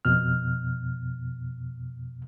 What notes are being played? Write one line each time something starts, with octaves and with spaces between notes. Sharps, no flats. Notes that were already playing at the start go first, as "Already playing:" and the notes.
F2 B2 F6